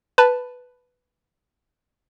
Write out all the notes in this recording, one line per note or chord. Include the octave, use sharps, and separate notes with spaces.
B4 A5